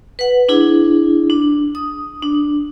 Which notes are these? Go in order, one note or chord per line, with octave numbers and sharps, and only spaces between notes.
B4 F#5
D4 E4 G#4
D4
D#6
D4